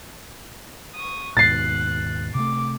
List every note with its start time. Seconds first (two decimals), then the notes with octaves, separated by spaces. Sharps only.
0.95 C#6 D#6
1.37 D#2 G#2 B2 F#6 A6 C7
2.35 C3 A3 D6